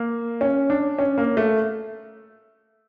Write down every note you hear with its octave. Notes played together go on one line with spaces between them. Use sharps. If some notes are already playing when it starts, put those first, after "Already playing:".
Already playing: A#3
C#4
D4
C#4
A#3
A3